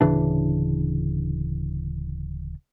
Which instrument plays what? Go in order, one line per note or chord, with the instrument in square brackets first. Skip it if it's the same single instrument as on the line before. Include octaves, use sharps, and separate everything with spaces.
[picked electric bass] D1 C#3 E3 D4